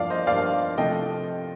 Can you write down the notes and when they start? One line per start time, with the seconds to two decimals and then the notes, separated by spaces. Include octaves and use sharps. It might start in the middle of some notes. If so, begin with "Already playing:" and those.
Already playing: G2 F3 A#3 D5 F5
0.10 C5 D#5
0.27 G2 F3 A#3 D5 F5
0.77 C3 F3 A3 D4 D#5 G5